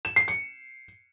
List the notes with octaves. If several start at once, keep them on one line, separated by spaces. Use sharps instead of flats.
E7
C7
C#7